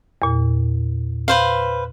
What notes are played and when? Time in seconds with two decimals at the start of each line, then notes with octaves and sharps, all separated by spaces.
0.22 E2 A#2
1.28 B4 C5 F5